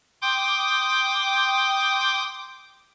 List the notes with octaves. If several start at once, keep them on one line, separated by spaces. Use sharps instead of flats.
G5 C6 D6 D#6 G6